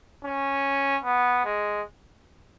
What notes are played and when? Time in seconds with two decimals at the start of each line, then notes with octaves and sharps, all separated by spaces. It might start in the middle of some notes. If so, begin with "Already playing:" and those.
0.24 C#4
1.04 B3
1.45 G#3